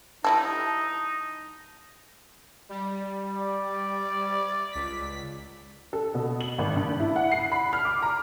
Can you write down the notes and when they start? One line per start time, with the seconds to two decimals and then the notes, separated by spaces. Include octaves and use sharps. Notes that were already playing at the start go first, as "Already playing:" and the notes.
0.24 G3 D#4 E4 A4
2.69 G3
3.36 D5
4.71 C#2 B6
5.93 A4
6.14 B2
6.41 F#7
6.58 G#1
6.76 G2
7.00 E4
7.16 F#5
7.32 C7
7.52 B5
7.73 F6
7.85 D6
8.02 A#5